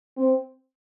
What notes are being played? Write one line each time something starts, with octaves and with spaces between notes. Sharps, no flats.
C4